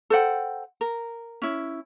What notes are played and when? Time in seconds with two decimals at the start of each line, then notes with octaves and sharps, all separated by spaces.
0.10 A4 C5 F#5 G5
0.81 A#4
1.42 C#4 E4